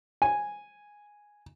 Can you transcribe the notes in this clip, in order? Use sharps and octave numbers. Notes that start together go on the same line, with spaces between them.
G#5